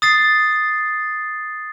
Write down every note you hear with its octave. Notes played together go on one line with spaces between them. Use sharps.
D#6 A6 C7